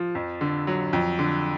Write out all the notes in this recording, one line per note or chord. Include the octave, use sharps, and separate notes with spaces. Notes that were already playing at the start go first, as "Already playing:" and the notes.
Already playing: F3
F2
D3
F#3
F2
D3